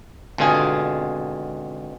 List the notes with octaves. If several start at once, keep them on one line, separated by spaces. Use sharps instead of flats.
G#1 B2 D3 F4 G#4 G#5